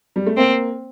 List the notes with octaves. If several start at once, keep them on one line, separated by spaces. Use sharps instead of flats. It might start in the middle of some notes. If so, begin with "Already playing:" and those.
G3
A3
A#3 C4